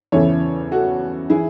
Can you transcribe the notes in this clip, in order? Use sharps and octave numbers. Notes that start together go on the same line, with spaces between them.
E2 C#3 E3 A4 C#5
F#4 A4
E3 E4 G#4